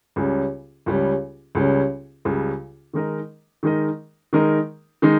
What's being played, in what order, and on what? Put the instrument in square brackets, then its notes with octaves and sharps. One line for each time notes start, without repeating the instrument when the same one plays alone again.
[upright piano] C#2 C#3 G3 C#4
C#2 C#3 G3 C#4
C#2 C#3 G3 C#4
C#2 C#3 G3 C#4
D#3 G#3 D#4 A#4 D#5
D#3 G#3 D#4 A#4 D#5
D#3 G#3 D#4 A#4 D#5
D#3 G#3 D#4